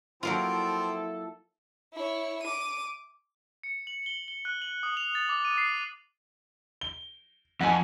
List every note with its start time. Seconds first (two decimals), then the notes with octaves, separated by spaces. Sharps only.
0.23 F3 F#3 A#3 C4 E4 F4 A4 C5
1.94 E4 C#5
2.42 D6 D#7
3.63 C#7
3.87 F#7
4.06 G7
4.28 G7
4.45 F#6
4.62 F#7
4.83 D#6
4.97 F7
5.15 A6
5.29 D6
5.45 D#7
5.58 C7
6.81 G7
7.61 F2 F#5 G#5